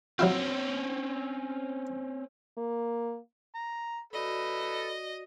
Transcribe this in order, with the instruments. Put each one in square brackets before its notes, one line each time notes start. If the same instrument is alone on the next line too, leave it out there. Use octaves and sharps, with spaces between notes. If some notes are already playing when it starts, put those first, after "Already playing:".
[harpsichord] F#3 E4 F4 [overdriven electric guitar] C4 C#4
[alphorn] A#3
[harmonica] A#5
[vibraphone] F#4 D5 [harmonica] A4 B4 [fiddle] D#5